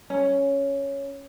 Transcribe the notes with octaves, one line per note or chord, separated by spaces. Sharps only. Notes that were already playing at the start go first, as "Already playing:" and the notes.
C#4